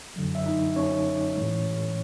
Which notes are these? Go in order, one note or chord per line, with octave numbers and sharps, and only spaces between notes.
F#2 D3 F#3
E5
D#4 D#5
C#4 C#5
A2 E3 G#3